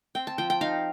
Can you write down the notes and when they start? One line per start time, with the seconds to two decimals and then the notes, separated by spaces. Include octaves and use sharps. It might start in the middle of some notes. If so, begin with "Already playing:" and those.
0.15 C4 G5
0.27 A5
0.38 F3 G5
0.50 G5
0.61 D#4 F5